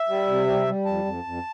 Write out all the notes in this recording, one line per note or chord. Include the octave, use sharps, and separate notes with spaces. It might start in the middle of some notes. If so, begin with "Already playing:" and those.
Already playing: E5
G3
C3
G3
G3
F2 A5
F2
F2